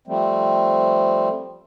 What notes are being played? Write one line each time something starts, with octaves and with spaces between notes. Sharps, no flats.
F3 G3 A3 C4